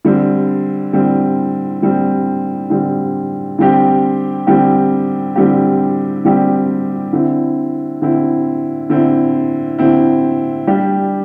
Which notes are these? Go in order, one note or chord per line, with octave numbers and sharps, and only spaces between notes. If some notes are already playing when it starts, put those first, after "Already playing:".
D3 G3 C4
D3 G3 C4
D3 G3 C4
D3 G3 C4
D3 G3 C4 G4
D3 G3 C4 G4
D3 G3 C4 G4
D3 G3 C4 G4
D3 C4 E4
D3 C4 E4
D3 C4 E4
D3 C4 E4
G3 D4 G4